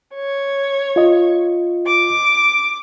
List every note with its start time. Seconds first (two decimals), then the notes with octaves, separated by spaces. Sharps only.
0.14 C#5
0.96 F4 D#5
1.86 D6